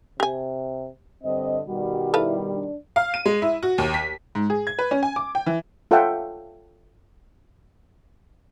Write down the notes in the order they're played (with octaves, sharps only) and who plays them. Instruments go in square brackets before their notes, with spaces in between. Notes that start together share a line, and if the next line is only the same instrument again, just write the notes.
[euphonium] C3 [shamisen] G4 G#5
[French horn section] G2 D3 D#5 [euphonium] C4
[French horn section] B2 D#3 G3 [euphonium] F#4
[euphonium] E4 [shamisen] A4 B4 F5
[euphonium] D4
[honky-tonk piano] F5
D#7
G#3
E4
F#4
D#2
B6
G#2
G#4
G#6
B4
C#4
G#5
D6
G5
E3
[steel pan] F4 A4 C#5 E5 F#5 G5